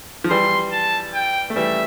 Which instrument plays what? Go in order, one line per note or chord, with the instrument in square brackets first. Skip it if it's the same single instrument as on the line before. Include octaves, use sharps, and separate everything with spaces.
[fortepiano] F3
[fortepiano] E3 G3 [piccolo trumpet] C6
[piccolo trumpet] A5
G5
[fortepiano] A3
[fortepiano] E3 G3 [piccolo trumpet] E5